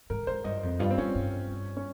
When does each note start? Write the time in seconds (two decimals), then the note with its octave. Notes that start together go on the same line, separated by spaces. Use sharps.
0.10 G#2 A#4
0.27 G#2 C5
0.44 G2 D#5
0.63 F2
0.79 G2 F4
0.91 C4
0.98 G2 C#4
1.15 G2
1.77 C#4